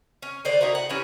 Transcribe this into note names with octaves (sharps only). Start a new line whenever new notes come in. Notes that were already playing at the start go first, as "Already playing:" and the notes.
C#4
D3 C5 D5
D#4 E4 F#4 A#4
F#5
E3 G3 C#4